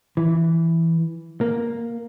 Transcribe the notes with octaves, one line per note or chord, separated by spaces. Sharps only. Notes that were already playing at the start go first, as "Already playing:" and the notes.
E3
A#3